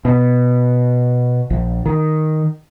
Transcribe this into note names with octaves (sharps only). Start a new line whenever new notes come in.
B2
A#1
D#3